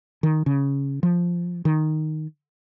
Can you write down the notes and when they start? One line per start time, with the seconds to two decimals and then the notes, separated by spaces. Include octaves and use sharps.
0.23 D#3
0.46 C#3
1.03 F3
1.65 D#3